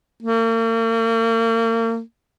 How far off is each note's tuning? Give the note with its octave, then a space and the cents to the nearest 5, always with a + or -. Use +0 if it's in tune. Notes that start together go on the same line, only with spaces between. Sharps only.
A#3 -40